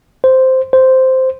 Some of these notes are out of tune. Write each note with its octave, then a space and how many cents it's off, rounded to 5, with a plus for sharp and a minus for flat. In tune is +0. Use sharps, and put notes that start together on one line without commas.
C5 -5
C5 -5